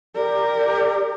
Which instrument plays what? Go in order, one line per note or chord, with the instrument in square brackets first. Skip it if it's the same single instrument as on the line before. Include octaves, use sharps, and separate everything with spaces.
[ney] G4 [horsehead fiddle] A#4 [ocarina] D5